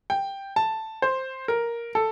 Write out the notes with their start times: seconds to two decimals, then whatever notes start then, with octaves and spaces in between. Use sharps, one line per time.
0.10 G5
0.56 A5
1.02 C5
1.48 A#4
1.95 A4